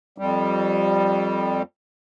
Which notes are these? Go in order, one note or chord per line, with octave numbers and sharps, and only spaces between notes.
F2 G3